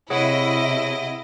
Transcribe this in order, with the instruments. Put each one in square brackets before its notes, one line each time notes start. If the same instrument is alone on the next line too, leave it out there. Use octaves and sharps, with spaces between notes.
[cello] C3 [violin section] E4 D#5 [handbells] G#4 C#5 F#5